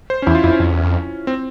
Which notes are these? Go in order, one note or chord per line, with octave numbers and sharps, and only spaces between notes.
C5
C#4
E2 E4
F4
F2 E4
C#4
F2
E2
F2
C4